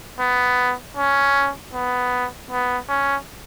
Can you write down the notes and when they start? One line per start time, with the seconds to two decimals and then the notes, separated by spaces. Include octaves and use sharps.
0.20 B3
0.97 C#4
1.73 B3
2.51 B3
2.89 C#4